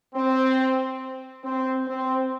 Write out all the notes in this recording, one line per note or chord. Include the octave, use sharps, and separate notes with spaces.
C4
C4
C4